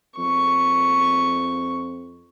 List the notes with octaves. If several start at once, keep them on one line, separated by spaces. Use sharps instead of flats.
F2 C#6